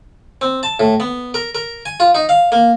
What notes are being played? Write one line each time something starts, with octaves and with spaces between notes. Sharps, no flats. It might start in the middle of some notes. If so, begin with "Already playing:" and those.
C4
A5
A2
B3
A#4
A#4
G#5
F4
D#4
F5
A#3